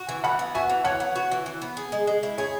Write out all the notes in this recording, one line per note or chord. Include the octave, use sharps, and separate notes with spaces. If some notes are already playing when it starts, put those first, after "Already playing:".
Already playing: F#4
E3
E3 F#5 B5
B3
F#4 E5 G#5
E3
E3 C#5 F#5
B3
F#4
E3
E3
B3
G#4
G#3
G#3
E4
G#4 C#5